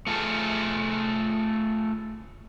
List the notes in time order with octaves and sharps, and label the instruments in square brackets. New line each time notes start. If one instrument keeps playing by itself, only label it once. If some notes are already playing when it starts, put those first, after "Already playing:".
[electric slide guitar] A3 F4 G#4 A4